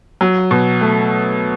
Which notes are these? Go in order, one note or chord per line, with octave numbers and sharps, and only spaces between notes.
F#3
B2
A3